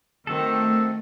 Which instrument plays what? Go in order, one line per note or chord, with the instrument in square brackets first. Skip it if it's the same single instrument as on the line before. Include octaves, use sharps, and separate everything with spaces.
[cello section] D#3 [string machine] A3 [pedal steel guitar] C4 F#4 A4 [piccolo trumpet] E6